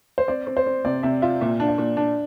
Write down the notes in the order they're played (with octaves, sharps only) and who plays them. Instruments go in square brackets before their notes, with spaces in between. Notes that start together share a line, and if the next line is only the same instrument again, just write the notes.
[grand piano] C5
[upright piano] C4 [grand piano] D5
[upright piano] C4
[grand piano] C5
[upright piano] C4
[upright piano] C3 [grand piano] D5
[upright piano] C3 [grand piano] E5
[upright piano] F4 [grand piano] E5
[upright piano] A#2 [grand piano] E5
[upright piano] D4
[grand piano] D5
[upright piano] A#2
D4